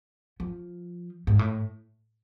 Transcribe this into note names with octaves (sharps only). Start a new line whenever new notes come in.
F3
G#2
A2